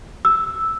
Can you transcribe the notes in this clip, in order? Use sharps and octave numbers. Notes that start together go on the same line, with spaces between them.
E6